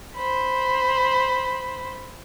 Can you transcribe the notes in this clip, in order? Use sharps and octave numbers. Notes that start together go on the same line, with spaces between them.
C5 B5